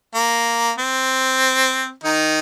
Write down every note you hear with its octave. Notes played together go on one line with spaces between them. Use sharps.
A#3
C4
D#3 D#4